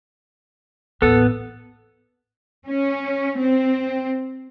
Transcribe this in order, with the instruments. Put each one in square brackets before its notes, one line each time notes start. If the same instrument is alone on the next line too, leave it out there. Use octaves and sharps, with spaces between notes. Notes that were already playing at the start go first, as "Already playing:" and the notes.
[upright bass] A1 D#2 [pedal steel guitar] B3 [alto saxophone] A4
[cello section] C#4
C4